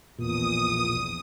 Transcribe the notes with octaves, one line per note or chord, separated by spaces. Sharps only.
A#1 E2 A#2 D#6